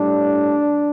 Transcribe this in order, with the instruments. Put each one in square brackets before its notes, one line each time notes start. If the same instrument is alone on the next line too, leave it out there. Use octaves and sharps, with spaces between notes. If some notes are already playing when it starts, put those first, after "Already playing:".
Already playing: [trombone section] A2 G3 D4